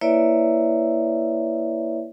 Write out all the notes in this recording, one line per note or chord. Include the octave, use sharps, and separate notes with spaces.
A#3 E4 B4 C#5 D5 E5